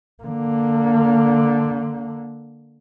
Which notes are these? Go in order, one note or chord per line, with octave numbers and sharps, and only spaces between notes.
D3 A#3